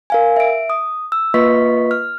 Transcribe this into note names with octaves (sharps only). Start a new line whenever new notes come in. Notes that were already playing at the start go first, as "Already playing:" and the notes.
A#4 F5 G#5
E5 D7
D#6
E6
A#3 F4 B4 D#5 C#6 B6
F6